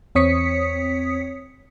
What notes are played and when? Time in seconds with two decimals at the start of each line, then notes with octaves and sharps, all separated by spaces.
0.15 E2 C4 C#5 D#6 B6 C#7